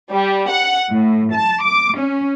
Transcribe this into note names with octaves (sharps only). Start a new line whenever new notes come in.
G3
F#5
A2
A5
D6
C#4